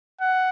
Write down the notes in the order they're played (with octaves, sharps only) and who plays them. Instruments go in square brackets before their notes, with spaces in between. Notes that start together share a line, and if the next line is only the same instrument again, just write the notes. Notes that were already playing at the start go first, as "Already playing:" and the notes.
[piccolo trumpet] F#5